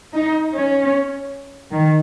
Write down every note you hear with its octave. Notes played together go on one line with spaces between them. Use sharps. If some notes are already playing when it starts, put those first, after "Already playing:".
D#4
C#4
D#3